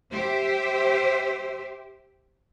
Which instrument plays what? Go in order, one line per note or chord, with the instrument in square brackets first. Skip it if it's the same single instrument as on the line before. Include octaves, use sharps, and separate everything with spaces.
[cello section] G4 C5 E5